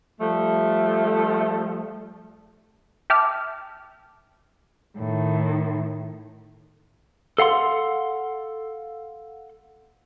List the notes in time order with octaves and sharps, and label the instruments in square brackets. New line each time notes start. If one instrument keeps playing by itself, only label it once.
[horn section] F3 G3 A3
[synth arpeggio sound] E5 G5 A5 D6 F6
[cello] A2 D#3
[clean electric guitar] A4 F5 F#5 C6